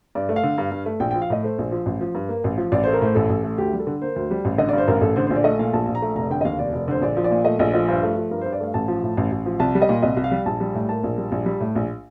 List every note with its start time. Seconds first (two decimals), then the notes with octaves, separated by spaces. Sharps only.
0.15 G2 D5
0.29 A3
0.36 F5
0.43 D3
0.58 G2
0.71 G2
0.86 A3
1.00 A#1 G5
1.11 G5
1.15 F3
1.22 F5
1.30 A2 D#5
1.43 A3 C5
1.59 A#1
1.72 F3
1.86 A1
2.01 F3
2.15 G2
2.29 A#3
2.44 A1
2.58 F3
2.72 A1 D5
2.84 A3 C5
2.93 A#4
3.01 A2 C5
3.15 A1 A4
3.30 A1
3.44 A3
3.58 D2 G4
3.73 G3
3.79 A4
3.87 D3
4.02 A#3 C5
4.16 D2
4.31 G3
4.45 A1
4.58 D3 D#5
4.69 G2 D5
4.78 C5
4.87 A1 A#4
5.01 A1 A4
5.16 D3 C5
5.27 A#1 C5
5.36 D5
5.44 A3 D#5
5.59 A#2 F5
5.73 A#1 A5
5.88 A#1
5.95 A#5
6.02 A3
6.16 F1 A#5
6.30 D3 G5
6.41 D#5
6.45 D#2 F5
6.59 F1 D5
6.73 F1
6.88 D3 C5
7.02 A#1 D5
7.17 F3
7.24 D5
7.31 A#2
7.45 A3 D#5
7.59 A#1 D#5
7.74 F3 D#5
7.88 G2 C5
8.03 A3
8.16 F3
8.31 G2 A#4
8.41 C5
8.46 G2
8.53 D5
8.60 A3 F5
8.74 A1 A5
8.88 F3
9.03 A2
9.17 A1
9.32 A1
9.46 F3
9.60 C2 A5
9.75 G3
9.82 D#5
9.89 A#2
10.02 C2 D#5
10.17 C2
10.24 F5
10.31 G3
10.46 A#1 A5
10.60 G3
10.74 A2
10.89 A#3 A5
11.04 A#1
11.18 G3
11.32 A#1
11.46 G3
11.60 A2
11.76 A#1